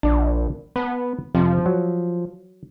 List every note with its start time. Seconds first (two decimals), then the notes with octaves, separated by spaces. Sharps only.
0.03 A#1 D4 D5
0.76 B3 B4 A5
1.35 F2 C3 F3
1.66 F#3